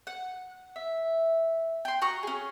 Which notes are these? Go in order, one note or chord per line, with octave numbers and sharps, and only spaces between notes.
F#5
E5
G5 C6
F#4 A#5 C#6 D#6
C#4 G#4